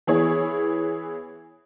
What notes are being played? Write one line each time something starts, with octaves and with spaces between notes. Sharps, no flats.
E3 B3 E4 G#4 C#5